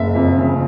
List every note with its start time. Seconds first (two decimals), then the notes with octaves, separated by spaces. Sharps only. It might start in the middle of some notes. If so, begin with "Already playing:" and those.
Already playing: F#1 E5
0.15 F2
0.38 C#3